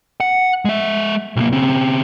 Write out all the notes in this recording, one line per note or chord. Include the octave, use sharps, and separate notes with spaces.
F#5
G#3 E5
B1 A#3
C#3 C4